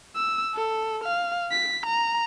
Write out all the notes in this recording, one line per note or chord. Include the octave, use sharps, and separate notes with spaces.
E6
A4
F5
B6
A#5